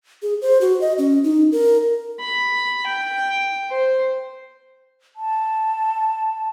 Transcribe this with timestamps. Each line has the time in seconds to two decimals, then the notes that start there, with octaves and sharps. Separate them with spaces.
0.22 G#4
0.42 C5
0.61 F#4
0.81 D#5
0.98 C#4
1.24 D#4
1.52 A#4
2.20 B5
2.87 G5
3.70 C5
5.16 A5